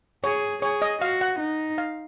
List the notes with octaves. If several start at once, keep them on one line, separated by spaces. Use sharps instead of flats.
G#4 C#5
G#4 C#5
D#5
F#4 F5
F#5
D#4
F5